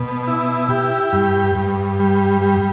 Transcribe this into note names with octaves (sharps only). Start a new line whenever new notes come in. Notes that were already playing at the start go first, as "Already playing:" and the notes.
Already playing: B2
E4
G4
G2
G2
G3
G3